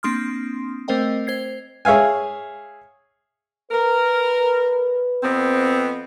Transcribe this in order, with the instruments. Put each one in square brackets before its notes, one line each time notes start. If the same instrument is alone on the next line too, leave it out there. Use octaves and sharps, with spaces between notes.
[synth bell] A#3 C4 D4 C6 D#6 F6
A3 C4 A#4 C5 D#5 G5
C5 G#6 C7
[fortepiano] G#4 C#5 E5 F5 G#5
[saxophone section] A#4 [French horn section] B4
[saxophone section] F2 B3 C4